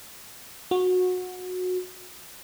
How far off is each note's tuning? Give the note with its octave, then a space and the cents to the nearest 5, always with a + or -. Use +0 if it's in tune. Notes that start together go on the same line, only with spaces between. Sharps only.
F#4 -20